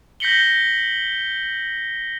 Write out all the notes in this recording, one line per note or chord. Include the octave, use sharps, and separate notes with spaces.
G6 A#6 B6 C#7 F#7 G7